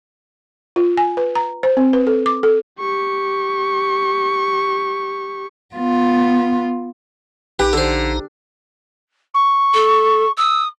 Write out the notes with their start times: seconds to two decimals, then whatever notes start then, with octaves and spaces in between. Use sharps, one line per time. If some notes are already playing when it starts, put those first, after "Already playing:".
0.76 F4
0.97 G#5
1.17 B4
1.35 A#5
1.63 C5
1.77 C4
1.93 B4
2.07 A4
2.26 D6
2.43 A4
2.79 G4 C#6
5.76 B3 F4
7.59 A#1 D#4 G4 B4 A#5
7.73 D3 A4 C5
9.34 C#6
9.74 A4
10.37 D#6 E6